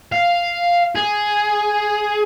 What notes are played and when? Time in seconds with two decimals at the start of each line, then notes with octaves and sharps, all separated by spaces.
0.12 F5
0.96 G#4